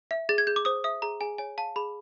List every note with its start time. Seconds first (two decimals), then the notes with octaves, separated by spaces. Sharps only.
0.11 E5
0.29 G#4 A6
0.38 G#6
0.47 G#4 G6
0.56 D6
0.65 C5 D#6
0.84 E5 D#6
1.02 G#4 A#5
1.21 G#4 G#5
1.38 C#5 G#5
1.58 F5 A5
1.76 G#4 B5